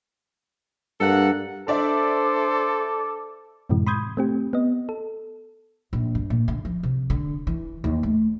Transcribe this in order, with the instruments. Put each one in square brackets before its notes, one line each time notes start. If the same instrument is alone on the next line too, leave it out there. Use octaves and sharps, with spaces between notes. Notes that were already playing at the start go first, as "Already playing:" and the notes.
[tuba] G2 [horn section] A#3 A4 F#5
[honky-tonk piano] D4 D5 E5 [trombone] A4 [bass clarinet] C5 [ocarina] D6
[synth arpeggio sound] F#2 A2 C3 E3 G#3
B5 C6 D#6 G6 G#6
A3 C4 G4
B3 D#5
A4
[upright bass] A#1
G2
A#2
D3
F3
C3
D3
E3
D#2
A3